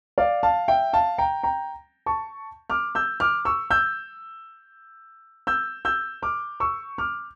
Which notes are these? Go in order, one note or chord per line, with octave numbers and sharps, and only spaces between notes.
D5 F5
F5 A5
E5 G5
F5 A5
G5 A#5
G5 A#5
A5 C#6
D6 F6
E6 G6
D6 F6
C#6 E6
E6 G6
E6 G6
E6 G6
D6 F6
C#6 E6
D6 F6